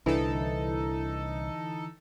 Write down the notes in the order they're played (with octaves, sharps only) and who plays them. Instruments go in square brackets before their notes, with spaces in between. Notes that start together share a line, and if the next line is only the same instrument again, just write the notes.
[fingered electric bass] C2 [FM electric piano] D3 E3 E4 [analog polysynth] D#4 A4